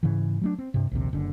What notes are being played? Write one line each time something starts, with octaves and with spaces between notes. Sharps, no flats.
G#2 C#3 E3
F#3 A3 D4
C4
G2 C3
A#1 D#2 C3
F#1 D3